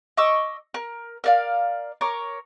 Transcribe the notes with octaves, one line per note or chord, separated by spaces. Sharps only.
D#5 C#6 D6 E6
A#4
A#4 D5 F5
A#4 C#5 D6